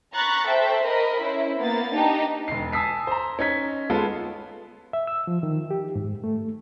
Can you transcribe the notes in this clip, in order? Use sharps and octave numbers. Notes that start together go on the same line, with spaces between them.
A#5 B5 C#6 F#6 A6
A4 C5 E5 G5
A#4 D#5 B5
C#4 E4 C5
A#3 B3 A6
D4 D#4 G4 A5
E1 C7
G#5 A5 D#6 E6 B6 C7
C5 A#5
C#4 D#4 G#6 B6
G#3 B3 F4 A4
E5
E6
F3
D#3
G4
G#2
A3